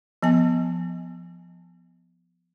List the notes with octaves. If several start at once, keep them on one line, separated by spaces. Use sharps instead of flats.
F3 B3 G#5